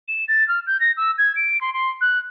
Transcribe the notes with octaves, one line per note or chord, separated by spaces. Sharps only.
E7
A6
F6
G6
A#6
E6
G#6
D7
C6
C6
F#6